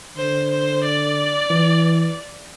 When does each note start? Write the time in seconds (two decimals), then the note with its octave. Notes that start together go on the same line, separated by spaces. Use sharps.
0.17 D3 C5
0.50 C5
0.83 D5
1.50 E3